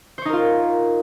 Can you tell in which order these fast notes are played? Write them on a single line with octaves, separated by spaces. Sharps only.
C5 C#5 D#4 A#4 F4